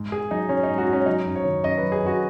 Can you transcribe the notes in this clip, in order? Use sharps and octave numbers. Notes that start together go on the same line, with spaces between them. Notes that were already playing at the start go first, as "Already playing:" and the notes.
Already playing: G#2
G#2 G#4
F#3 D#4
F#3 C#4
D#4
G#2
F#4
G#2 C#4
F#3 D#4
F#2
C#5
D#3
F#2 D#5
B4
F#3
G#4
F#2 F#4